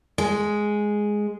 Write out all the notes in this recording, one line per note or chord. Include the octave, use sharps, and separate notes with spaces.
G#3